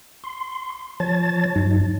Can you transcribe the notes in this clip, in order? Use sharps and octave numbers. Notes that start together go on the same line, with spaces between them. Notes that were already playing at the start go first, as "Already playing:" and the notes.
C6
F3 C#5 A5 A6
G2 F#3 D#4